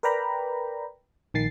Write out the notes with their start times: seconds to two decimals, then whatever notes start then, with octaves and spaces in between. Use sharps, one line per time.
0.03 A#4 B4 D5 G5 A#5 B5
1.34 A#1 D#3 A6 C7